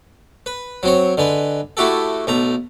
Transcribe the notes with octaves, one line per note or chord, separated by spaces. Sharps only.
B4
F#3 C4 C#5
D3 G#3 B4
A3 E4 F#4 G4 A4
B1 A3 A#5